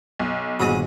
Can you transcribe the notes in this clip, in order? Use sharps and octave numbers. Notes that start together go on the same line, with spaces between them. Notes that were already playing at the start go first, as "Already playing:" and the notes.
B1
G1 A#2 D#3 A#3 F#4 G#4 G#5